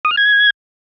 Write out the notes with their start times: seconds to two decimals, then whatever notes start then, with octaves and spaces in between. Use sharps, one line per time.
0.05 D#6
0.11 F6
0.17 G#6